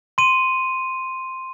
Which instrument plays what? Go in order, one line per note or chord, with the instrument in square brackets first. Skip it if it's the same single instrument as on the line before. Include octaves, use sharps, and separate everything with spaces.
[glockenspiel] C6 D#7